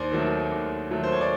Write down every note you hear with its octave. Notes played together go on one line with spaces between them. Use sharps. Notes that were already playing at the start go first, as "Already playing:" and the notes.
Already playing: D#2 C5 D5
D#3 F#3 A3
D#2
D#3 F#3 A3
C5
C#5
D5